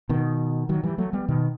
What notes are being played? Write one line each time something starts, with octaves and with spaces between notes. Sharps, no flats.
B2 D#3
D#3 F#3
E3 G3
F#3 A3
G3 B3
B2 D#3